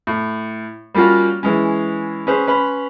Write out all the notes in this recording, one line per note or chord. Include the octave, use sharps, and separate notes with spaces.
A2
G3 A#3 C#4 F4 F#4
E3 G#3 C#4
C#4 G#4 B4 C5
C#4 B4 B5 C6